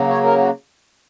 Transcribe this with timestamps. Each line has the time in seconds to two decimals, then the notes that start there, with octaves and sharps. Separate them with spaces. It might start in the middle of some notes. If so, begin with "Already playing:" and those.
Already playing: C#3 F#3 A#3
0.08 C#5
0.24 A#4
0.38 F#4